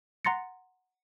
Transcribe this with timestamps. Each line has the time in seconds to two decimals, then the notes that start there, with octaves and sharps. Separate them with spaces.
0.25 F#5 A#5 C6 A6 A#6 C#7